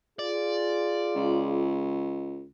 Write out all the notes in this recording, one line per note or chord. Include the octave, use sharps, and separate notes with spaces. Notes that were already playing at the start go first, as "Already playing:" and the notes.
F4 G#4 D5
C#2